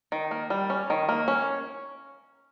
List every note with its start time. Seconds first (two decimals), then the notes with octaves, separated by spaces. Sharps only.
0.12 D#3
0.31 A#3
0.50 G3
0.70 C#4
0.90 D#3
1.09 A#3
1.28 C#4